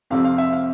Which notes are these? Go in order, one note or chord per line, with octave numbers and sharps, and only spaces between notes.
F2 C3 F3 C4 F5
F5
E5
F5